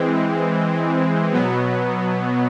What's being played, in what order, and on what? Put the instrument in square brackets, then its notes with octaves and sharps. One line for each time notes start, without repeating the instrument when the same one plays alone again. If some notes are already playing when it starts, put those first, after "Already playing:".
Already playing: [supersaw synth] E3 G#3 C4
B2 F#3 B3